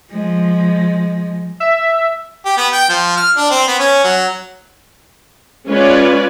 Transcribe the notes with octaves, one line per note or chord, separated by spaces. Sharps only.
F3 G#3
E5
G4
B3
G5
F3
F6
D4
C4
B3
C#4
F#3
G#3 C#4 F4 B4 C#5 D5